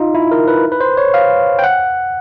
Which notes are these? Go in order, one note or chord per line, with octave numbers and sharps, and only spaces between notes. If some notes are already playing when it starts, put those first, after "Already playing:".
Already playing: D#4 F4
E4
A#4
B4
B4
C5
C#5
F5
G5
F#5